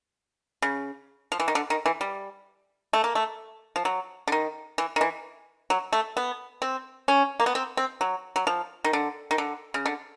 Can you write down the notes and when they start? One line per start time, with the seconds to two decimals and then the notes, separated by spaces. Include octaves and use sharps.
0.62 C#3
1.32 F3
1.40 E3
1.48 D#3
1.55 D3
1.70 D#3
1.86 E3
2.01 G3
2.93 A3
3.04 A#3
3.15 A3
3.76 F3
3.85 F#3
4.28 D3
4.32 D#3
4.78 E3
4.96 D#3
5.01 E3
5.70 F#3
5.93 A3
6.17 B3
6.62 C4
7.08 C#4
7.40 A#3
7.46 B3
7.55 C4
7.77 C4
8.01 F#3
8.36 F#3
8.47 F3
8.84 D#3
8.93 D3
9.31 D#3
9.38 D3
9.74 C#3
9.86 D3